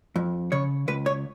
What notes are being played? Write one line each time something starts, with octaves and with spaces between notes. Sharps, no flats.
F2
C#3 C#5
C#2 B4
C#5